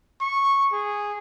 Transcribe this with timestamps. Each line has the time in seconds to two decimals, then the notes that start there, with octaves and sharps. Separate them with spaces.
0.21 C#6
0.72 G#4